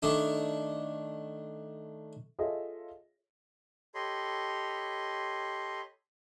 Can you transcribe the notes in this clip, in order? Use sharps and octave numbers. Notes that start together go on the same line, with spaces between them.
D#3 A3 D4
F4 G#4 A4 C#5 D#5 E5
G4 A4 C#5 D#5 B5 C6